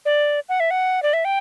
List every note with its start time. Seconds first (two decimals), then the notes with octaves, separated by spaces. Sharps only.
0.05 D5
0.49 F#5
0.60 E5
0.70 F#5
1.02 D5
1.13 E5
1.25 G5